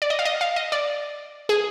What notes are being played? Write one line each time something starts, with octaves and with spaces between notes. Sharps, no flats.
D5
D#5
F5
D#5
F5
D#5
D5
G#4